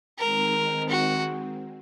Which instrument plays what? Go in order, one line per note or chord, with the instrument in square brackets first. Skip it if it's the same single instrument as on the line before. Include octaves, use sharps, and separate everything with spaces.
[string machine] D#3 G#3 C4 [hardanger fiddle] A#4
[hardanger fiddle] F#4